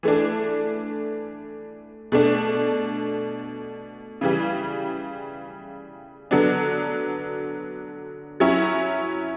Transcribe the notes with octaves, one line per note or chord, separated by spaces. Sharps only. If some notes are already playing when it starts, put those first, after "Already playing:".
E3 A3 D4
B2 A3 D4
C#3 E3 G3
D3 F#3 B3 D4
F#3 C#4 E4